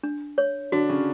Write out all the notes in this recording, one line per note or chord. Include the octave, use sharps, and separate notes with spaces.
D4
C#5
D3 D4 F#4
C#3 C#4